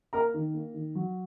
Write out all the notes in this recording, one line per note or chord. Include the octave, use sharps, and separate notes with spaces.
A#3 A#4 A#5
D#3
A#3
D#3
F#3